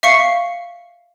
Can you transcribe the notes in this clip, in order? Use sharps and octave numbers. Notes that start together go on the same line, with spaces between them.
E5 F5 C#6 C7 C#7